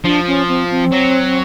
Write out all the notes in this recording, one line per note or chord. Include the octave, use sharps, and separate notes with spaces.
F3 D4
C#4
C4
C4
F#3